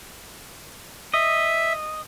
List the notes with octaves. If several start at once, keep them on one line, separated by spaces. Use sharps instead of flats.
D#5 E5